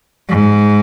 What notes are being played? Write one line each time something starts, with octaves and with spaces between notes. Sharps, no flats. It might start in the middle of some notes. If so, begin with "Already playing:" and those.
G#2